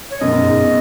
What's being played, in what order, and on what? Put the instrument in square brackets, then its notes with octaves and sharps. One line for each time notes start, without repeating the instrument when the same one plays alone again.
[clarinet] C#5
[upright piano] F#2 B2 [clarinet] D#5
[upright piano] F#2 B2
G#2
G#2
B2